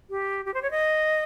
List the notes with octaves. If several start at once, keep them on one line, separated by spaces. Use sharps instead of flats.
G4
G4
C5
C#5
D#5